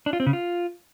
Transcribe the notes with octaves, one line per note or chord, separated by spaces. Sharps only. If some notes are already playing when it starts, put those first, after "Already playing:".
D4
F4
C4
C#3
F4